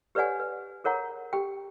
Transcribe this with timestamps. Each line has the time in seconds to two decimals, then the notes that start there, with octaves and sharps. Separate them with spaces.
0.15 G4 B4 C#5 D5 F#5 G#5
0.40 B4
0.84 G#4 A#4 C#5 F#5 A#5
1.33 G4 G5